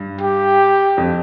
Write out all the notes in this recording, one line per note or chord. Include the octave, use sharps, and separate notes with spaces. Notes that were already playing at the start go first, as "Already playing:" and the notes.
Already playing: G2
G4
F2